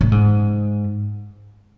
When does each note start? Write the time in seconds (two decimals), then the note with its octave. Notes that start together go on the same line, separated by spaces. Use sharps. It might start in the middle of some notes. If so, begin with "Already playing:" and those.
0.01 A2
0.12 G#2